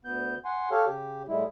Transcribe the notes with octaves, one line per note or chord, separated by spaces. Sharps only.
D2 B3 G6
F#5 G#5 C6
G4 A4 C#5 F5
C#3 G4
A2 G3 G#3 E4